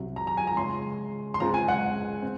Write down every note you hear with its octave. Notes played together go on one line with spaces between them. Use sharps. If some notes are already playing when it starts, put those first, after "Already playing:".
Already playing: C2 C3 F#3
A#5
A#5
G#5
A#5
C#3 G#3 C#4 F4 C6
C6
C#2 C#3 G#3 C4 F4 A#5
G#5
F#5
C4